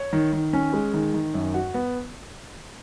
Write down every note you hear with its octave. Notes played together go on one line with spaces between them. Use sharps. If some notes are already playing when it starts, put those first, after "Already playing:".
Already playing: C#5
D#3
D#3
C#4
G#3
D#3
D#3
F#2
F#4
B3